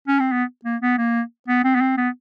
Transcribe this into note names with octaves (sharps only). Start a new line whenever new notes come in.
C#4
C4
B3
A#3
B3
A#3
B3
C4
B3
C4
B3